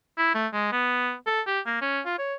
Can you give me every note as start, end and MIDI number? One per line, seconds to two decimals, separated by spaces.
0.18 0.34 64
0.34 0.47 57
0.53 0.67 56
0.72 1.13 59
1.26 1.41 69
1.47 1.60 67
1.66 1.81 58
1.81 2.00 61
2.05 2.16 65
2.18 2.35 73